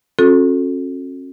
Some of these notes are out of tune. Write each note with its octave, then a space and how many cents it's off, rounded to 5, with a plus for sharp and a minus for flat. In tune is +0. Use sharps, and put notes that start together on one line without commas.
C#4 -40 F#4 -40 A4 +0